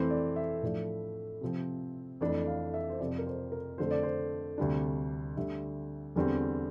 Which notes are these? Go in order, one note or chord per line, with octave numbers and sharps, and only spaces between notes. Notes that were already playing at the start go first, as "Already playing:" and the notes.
Already playing: F2 E3 A3 C4 C5
D5
E5
A2 F3 A3 D4
C3 F3 C4
F2 E3 A3 D4
F5
E5
C5
F2 C3 F3 C4 D5
A#4
C5
A#4
F2 D3 A3 C5
D5
C5
D2 C3 G3 D4
D2 D3 G3 D4 E5
E2 D3 G3 C4